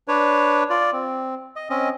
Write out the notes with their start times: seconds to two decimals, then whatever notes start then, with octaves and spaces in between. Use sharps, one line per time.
0.08 D4 B4 C#5
0.70 F4 D5
0.93 C4
1.56 D#5
1.70 C4 C#4 D#5